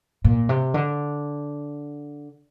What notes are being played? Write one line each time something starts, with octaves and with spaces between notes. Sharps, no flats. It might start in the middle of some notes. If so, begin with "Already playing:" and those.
A#2
C3
D3